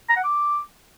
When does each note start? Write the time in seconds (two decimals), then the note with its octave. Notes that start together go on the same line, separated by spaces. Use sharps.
0.09 A#5
0.16 F#5
0.24 D6